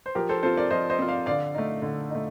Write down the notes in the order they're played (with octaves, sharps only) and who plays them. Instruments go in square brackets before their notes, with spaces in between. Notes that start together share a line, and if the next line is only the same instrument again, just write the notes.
[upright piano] C5
[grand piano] F3 [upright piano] G4 A#4
[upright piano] A4 C5
[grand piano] C4 F4 [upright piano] A4 C5
[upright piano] A#4 D5
[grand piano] F3 [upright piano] C5 D#5
[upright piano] C5 D#5
[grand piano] C4 F4
[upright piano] D5 F5
[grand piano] D3 [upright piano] D5 F5
[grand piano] A3 D#4
D3
A3 D#4